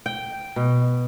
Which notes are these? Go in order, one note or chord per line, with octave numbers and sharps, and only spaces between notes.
G5
B2